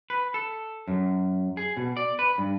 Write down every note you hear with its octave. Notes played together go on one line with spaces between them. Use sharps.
B4
A4
F#2
G#4
B2
D5
B4
G2